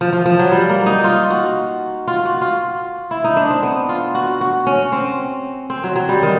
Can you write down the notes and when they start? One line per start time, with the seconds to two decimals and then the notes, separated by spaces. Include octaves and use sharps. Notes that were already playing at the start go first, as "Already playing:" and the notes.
0.01 F3
0.13 F3
0.26 F3
0.39 F#3
0.52 G3
0.69 A#3
0.86 D#4
1.04 F4
1.30 F#4
2.07 F4
2.25 F#4
2.42 F4
3.11 E4
3.24 D#4
3.37 D4
3.50 C4
3.63 B3
3.89 F4
4.15 F#4
4.41 F#4
4.67 C#4
4.92 C4
5.70 C4
5.84 F#3
5.96 F#3
6.09 G3
6.23 D#3